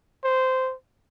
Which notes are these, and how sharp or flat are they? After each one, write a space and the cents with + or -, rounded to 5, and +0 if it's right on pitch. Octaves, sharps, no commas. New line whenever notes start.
C5 -10